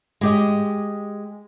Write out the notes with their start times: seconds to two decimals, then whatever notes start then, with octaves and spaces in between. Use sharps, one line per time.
0.21 G#3 G4 D#5